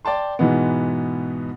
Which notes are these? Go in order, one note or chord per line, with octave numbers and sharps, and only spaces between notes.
D5 G5 A5 C6
G#2 B2 E3 G#3 B3